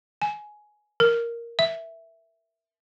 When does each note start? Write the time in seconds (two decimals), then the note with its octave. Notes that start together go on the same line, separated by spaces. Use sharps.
0.22 G#5
1.00 A#4
1.59 E5